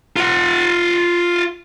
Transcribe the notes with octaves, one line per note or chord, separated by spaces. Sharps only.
F4 F#5